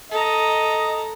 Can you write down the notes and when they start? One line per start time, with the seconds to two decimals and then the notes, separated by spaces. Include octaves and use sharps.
0.11 A4 D#5 A#5